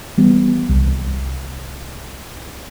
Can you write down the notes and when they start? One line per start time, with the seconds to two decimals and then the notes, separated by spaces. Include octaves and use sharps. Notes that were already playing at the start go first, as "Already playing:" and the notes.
0.18 E3 G3 B3
0.69 C2